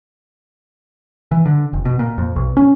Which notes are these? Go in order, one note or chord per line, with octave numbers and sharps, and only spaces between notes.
E3
D3
F1
B2
A#2
F2
B1
C#4